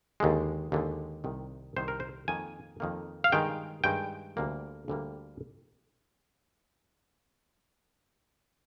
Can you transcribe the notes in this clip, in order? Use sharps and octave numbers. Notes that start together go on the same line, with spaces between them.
D#2 D3 G#3
D#2 D3 G#3
C2 C3 D#3
C2 C3 D#3 C5
A#4
C5
F2 D#3 A#3 G#5
F2 D#3 A#3
F5
G2 D#3 G#3 G5
G2 D#3 G#3 G5
D2 D3 G3 A#3
D2 D3 G3 A#3